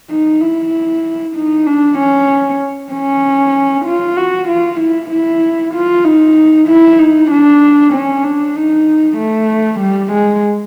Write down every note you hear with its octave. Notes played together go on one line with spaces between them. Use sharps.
D#4
E4
D#4
D4
C#4
C#4
F4
F#4
F4
E4
E4
F4
D#4
E4
D#4
D4
C#4
D4
D#4
A3
G3
G#3